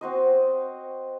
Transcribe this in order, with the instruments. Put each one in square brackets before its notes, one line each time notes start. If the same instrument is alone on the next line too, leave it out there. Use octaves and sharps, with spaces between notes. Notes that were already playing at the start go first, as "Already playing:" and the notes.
[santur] C4 F#4 C5 D#5